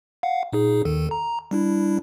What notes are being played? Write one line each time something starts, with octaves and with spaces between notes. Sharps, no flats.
F5 F#5
A#2 D#4 G#4
D#2 D#3 A4
A#5
G3 D4 E4